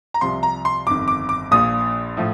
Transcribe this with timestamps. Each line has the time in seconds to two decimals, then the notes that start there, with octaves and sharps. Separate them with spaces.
0.14 A#5
0.21 C2 C3 F3 C6
0.43 A#5
0.65 C6
0.87 G1 F2 D#3 D6
1.08 D6
1.29 D6
1.51 A#1 A#2 F3 D#6
2.17 A2 F3